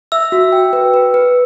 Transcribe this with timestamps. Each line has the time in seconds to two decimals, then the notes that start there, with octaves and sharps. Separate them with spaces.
0.12 E5 E6
0.32 F#4
0.52 G5
0.73 B4
0.94 B4
1.14 B4